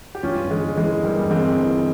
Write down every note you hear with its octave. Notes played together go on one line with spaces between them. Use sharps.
G4
G2 C#4 F4
G1
G#3
G1
G#3
E3
G2 G3 A#3
G1
G#3 C4
G1
E3